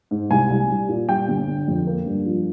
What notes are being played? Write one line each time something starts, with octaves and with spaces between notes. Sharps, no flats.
G#2
C2 G#5
C2
G3
A#2
G3 G5
G1
D3
F2
A#3
G2
F3